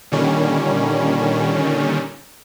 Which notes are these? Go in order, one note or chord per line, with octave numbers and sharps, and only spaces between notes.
A#2 D3 D#3 G3 C#4